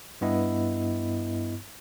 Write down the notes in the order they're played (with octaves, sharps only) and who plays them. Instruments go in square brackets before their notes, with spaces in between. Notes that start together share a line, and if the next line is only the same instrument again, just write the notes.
[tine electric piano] G2 B3 E4 D#5